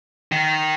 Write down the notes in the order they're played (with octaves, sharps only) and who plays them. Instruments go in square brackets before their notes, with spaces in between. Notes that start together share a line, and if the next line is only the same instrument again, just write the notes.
[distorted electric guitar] D#3